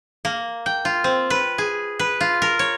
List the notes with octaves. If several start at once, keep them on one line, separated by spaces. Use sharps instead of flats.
A#3
G5
F4
C4
B4
G#4
B4
F4
A#4
C#5